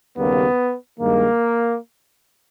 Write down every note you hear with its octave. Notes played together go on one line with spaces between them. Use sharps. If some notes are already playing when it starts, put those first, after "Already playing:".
D#2 C#3 G3 A#3 B3
G2 D#3 G#3 A#3